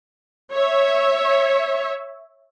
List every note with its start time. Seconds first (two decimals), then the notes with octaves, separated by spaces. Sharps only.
0.52 C#5 E5